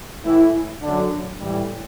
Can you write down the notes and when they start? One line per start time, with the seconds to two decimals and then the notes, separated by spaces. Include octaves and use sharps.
0.24 A2 E3 E4
0.82 F#2 D3 D4
1.40 A2 E3 G3